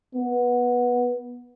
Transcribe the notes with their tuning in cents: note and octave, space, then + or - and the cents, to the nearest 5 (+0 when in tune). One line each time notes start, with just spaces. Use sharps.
B3 -15